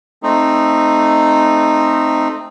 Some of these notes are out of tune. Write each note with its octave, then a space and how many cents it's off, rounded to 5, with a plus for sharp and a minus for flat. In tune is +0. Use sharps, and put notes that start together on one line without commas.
A3 +0 C4 +5 D#4 -10